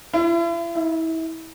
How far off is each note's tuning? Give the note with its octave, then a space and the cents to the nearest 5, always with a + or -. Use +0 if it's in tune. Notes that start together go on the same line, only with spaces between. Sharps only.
E4 +40
E4 -30